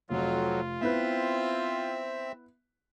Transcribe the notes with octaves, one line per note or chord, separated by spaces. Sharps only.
F1 F2 F#3 F4
B3 C4 E4 B4 E5